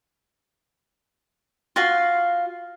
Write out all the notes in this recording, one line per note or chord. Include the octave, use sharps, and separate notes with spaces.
F4 F#4 F5